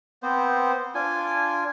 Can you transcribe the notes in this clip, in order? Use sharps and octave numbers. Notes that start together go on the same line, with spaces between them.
B3 C4 C5
D4 F4 G#5